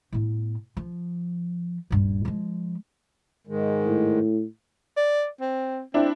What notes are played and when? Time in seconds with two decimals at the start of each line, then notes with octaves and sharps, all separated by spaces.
0.12 A2 B3
0.77 F3
1.91 D#1 G2
2.25 F3 G#3
3.47 G#2 D#3 G#3
3.86 A2
4.97 D5
5.41 C4
5.94 C4 D4 E4